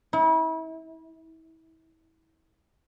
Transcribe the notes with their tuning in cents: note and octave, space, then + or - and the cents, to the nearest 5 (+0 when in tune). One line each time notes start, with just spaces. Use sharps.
E4 -35